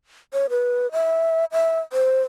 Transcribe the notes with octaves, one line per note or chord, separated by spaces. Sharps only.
C#5
B4
E5
E5
C5